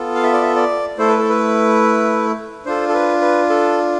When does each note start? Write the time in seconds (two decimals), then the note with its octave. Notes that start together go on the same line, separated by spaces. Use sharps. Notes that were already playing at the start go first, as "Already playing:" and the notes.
Already playing: B3 F4 A4
0.15 F5
0.23 E5
0.33 D5
0.42 E5
0.56 D5
0.98 A3 E4 A4 C5
1.09 B4
1.19 A4
1.29 B4
2.66 D4 F4 A4 C5
2.89 A4
2.94 B4
3.21 B4
3.50 A4